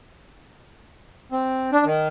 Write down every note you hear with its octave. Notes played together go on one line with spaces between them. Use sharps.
C4
D4
D#3